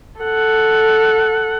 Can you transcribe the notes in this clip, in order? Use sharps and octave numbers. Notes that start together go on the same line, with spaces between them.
A4 F#5